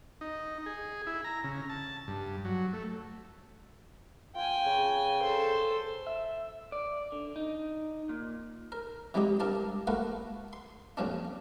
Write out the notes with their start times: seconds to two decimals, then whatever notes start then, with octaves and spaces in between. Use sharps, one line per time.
0.21 D#4
0.66 G#4
1.07 E4
1.24 A#5
1.44 C#3
1.69 A5
2.08 G2
2.45 F#3
2.73 A3
4.35 F4 G5 G#5
4.66 C#3
5.22 A4 C5
6.07 E5
6.72 D5
7.12 D3
7.36 D#4
8.09 A#2
8.72 A#4
9.14 C3 E3 G3 G#3 D#4 G4
9.40 G2 A#4 A5 D6
9.87 A3 A#3 F#4 A#4 B4
10.53 C6
10.97 F2 A#2 F3 C#4 D4